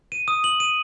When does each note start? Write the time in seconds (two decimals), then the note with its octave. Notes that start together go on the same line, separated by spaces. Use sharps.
0.12 D#7
0.28 D#6
0.44 F#7
0.60 D#7